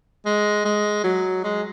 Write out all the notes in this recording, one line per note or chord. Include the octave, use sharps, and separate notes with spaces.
G#3
G#3
F#3
G#3